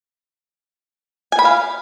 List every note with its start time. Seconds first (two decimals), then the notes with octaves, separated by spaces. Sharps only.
1.32 G#5
1.39 B5
1.45 F5